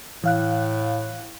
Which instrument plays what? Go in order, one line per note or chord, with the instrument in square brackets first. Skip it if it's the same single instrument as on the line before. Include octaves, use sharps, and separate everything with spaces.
[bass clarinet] A2 [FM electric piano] E3 F5 F#6